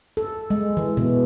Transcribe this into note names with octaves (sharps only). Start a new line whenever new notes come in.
A4
G#3
E3
B2